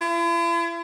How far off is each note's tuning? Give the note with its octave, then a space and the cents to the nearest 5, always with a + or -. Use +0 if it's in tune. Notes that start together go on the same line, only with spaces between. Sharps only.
E4 +45